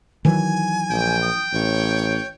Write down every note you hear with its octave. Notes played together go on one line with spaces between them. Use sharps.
D#3 E3 F#3 G#5
A#1 G5
D#6
A1 C#5